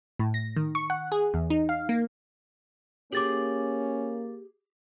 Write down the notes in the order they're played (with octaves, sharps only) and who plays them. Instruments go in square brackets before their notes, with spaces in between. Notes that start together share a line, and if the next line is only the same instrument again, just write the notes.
[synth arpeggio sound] A2
A#6
D#3
C#6
F#5
G#4
E2
D#4
F5
A#3
[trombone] A#3 [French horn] C#4 [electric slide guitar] G4 G#4 [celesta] D6 A6 F#7